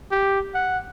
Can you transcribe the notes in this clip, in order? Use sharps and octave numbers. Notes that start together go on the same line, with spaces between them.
G4
F#5